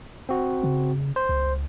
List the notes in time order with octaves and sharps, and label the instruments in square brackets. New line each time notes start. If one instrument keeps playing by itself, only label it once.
[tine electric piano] C4 F#4
[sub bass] C#3
[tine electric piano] C5
[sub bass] C#2